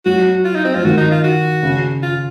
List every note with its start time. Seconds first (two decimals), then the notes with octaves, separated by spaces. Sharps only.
0.06 F#3 F#4
0.45 F4
0.55 D#4
0.65 C4
0.75 F3 F4
0.85 D#3 F#4
0.97 D#4
1.11 F4
1.24 F#4
1.63 C#3
2.03 F4